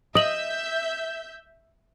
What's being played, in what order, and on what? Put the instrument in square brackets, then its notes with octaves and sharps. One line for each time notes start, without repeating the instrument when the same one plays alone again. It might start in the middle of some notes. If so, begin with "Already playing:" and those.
[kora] D#5 [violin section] E5 G6 [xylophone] D#6 F#7